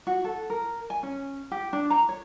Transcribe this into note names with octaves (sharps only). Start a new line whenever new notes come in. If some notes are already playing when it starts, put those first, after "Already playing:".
F#4
A4
A#4
G#5
C#4
G4
D4
A#5
C#5